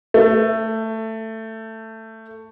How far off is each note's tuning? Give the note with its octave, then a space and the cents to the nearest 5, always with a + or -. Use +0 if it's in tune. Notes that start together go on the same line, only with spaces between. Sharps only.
A3 +15